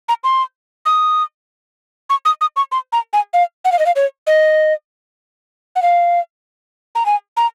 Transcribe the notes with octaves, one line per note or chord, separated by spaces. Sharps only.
A#5
C6
D#6
C#6
D#6
D#6
C#6
C6
A#5
G#5
F5
F#5
F5
D#5
F5
C#5
D#5
F#5
F5
A#5
G#5
A#5